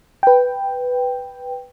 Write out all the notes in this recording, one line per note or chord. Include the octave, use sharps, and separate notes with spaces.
B4 G5